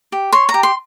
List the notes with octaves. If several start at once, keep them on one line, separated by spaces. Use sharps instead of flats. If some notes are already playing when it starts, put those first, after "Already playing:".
G4
C#5 C6
A#5
G4
C6